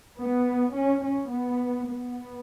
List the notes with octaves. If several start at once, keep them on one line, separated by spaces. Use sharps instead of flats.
B3
C#4
C#4
B3
B3